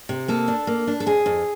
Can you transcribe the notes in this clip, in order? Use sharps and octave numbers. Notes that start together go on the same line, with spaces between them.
C3
A#3 A4
D4
A#3
D4
A4
F2 G#4
F2